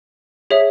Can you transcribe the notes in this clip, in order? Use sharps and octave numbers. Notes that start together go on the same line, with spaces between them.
G#4 C#5 E5